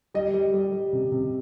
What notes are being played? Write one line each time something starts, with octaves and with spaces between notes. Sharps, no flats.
G3 D#5
G3
G3
G3
C3
C3